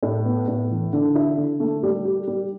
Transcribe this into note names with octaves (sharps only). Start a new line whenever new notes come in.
A2
B3
A2
E3
D3
E4
D3
A3
G3
G4
G3